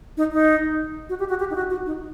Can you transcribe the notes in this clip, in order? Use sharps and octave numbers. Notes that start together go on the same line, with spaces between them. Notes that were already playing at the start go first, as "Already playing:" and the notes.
D#4
D#4
F#4
G4
F#4
G4
D#4
F#4
F#4
D#4